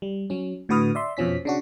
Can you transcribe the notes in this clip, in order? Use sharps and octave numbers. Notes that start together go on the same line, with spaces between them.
G3
F#3 C#4
A2 D3 F#4 B4 D#6 F6
D5 E5 C6
F2 B2 F3 C#4 B6
C#3 D4 F#4